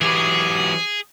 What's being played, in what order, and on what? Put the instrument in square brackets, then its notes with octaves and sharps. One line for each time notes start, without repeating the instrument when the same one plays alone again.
[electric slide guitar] E3 F#3 G4 [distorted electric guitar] G#4